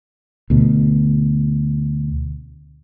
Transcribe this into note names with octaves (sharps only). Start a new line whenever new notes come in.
D2 B2